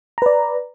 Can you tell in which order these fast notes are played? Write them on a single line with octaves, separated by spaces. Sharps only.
A#5 B4 D5